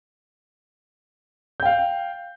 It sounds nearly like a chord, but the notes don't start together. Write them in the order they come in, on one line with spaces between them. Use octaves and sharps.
G6 G5 F5